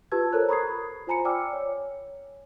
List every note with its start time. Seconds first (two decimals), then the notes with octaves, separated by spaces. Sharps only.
0.12 F4 G4 B4 A5 E6 G#6
0.33 A4 A#4 C5 C#5 A#5 F#6
0.49 A#5 B5 C#6 D#6 G#6 C7
1.07 F4 C5 G#5 A#5 B5 C#7
1.25 D5 G5 G#5 D6 E6 F6
1.53 C#5